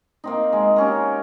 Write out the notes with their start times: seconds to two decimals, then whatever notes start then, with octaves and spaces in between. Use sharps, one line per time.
0.24 A#3 C4 D#4
0.53 G#3
0.76 A#3 C#4 G4